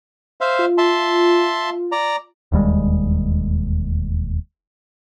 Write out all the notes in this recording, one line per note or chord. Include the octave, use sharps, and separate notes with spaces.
C5 E5 F5
F4
E5 A5 C6
D5 A#5
E1 D#2 G3 G#3